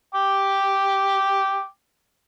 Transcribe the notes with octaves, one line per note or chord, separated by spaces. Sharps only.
G5 D6